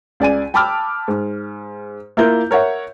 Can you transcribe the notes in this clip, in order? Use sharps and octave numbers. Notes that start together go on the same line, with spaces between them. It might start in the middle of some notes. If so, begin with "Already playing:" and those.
C#2 D5 G#5 D#7
G5 A5 B5 D6 E6 F6
G#2
A#3 E4 F4 A#4 G6
A#4 C#5 E5 F#5